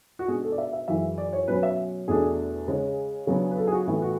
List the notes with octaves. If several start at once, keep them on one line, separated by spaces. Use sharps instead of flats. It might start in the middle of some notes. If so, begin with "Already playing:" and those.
F#4
B2 G#3 B3 D4 G#4
A4
D5
E5
E5
F#2 E3 G#3 E5
D5
C#5
B2 F#3 C#4 B4
E5
E2 B2 A3 D4 G#4
C#3 G#3 C#4
C#3 F#3 B3 D4
B4
A4
G#4
F#4
A2 E3 B3 F#4
F#4